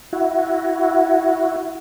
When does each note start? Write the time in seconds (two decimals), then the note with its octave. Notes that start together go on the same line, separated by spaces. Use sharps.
0.13 E4 F#4